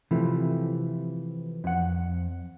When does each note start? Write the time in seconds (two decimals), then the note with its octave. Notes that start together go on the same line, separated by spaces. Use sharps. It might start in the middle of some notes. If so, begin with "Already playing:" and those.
0.11 C3 E3 F3 A3
1.64 F2 F#5